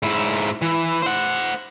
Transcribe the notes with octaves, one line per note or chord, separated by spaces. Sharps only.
G#2 E4
E3
C5 F#5